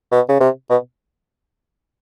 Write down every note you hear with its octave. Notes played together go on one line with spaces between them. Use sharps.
B2
C#3
C3
B2